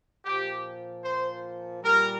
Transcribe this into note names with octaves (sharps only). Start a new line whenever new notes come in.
A#2 F3 G4
C5
A#2 G3 A#4